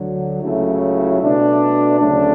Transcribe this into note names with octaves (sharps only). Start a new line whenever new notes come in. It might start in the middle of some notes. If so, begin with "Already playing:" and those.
Already playing: D2 D3 F#3
C#2 C#3 F#3 A3 E4
B2 A3 D4
D2 C#3 F#3 A3 D4